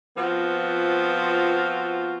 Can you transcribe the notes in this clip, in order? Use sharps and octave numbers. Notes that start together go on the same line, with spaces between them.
F3 B3 C4 F4 F#4